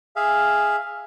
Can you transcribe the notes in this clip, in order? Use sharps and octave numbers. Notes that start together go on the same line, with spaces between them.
G#4 E5 F5